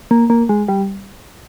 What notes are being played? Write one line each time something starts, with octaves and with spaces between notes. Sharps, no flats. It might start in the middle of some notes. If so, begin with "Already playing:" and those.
A#3
A#3
G#3
G3